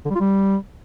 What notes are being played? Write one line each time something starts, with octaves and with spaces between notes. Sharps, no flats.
D3
G3
F4
G3